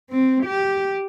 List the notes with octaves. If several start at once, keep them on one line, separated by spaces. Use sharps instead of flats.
C4
G4